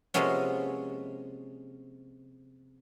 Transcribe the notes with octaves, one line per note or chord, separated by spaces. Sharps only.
C3 F3 G#3 A#3 B3 C#4